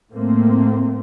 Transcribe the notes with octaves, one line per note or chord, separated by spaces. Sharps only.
A2 A3 A#3 C4